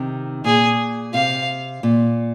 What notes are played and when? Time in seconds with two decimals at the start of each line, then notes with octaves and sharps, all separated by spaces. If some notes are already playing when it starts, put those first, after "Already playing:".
Already playing: C3 D#3
0.45 A#2 G#4
1.14 C3 F5
1.83 A#2